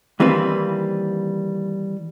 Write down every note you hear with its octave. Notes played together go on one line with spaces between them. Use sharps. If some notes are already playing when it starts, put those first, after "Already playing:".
D#3 E3 G3 A#3 C4 B4